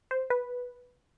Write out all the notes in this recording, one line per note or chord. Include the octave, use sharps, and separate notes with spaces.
C5
B4